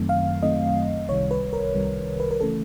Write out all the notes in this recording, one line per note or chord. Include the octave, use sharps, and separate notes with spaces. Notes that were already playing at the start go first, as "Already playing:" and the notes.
Already playing: F#2 D#3 F#3 A3 C4
F5
F#2 D#3 F#3 A3 C4 D#5
C2 C3 D#3 G3 C#5
B4
A#4
C2 C3 D#3 G3
B4
A#4
C#3 E3 A3 C#4 A4